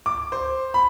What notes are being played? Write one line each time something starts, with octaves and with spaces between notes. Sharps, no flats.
D6
C5
B5